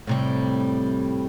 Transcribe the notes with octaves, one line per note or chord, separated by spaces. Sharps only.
A2 C3 G3